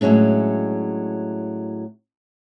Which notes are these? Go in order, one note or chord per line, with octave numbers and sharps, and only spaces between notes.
A2 F#3 G#3 C#4 D4